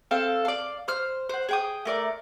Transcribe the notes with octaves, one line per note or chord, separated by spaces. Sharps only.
C4 A4 F5
D5 F5
C5 F6
C5 F#5
G#4 G5 D#6
A3 A#4 D5